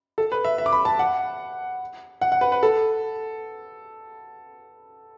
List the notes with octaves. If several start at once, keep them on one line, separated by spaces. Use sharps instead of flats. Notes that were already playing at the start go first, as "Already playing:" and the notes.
A4
B4
E5
E5
D6
B5
A5
F#5
F#5
F#5
B4
B4
A4